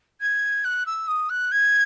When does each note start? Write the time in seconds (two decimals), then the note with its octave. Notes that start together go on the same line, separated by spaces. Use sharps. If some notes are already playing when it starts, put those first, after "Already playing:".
0.21 G#6
0.64 F#6
0.86 E6
1.08 D#6
1.30 F#6
1.52 G#6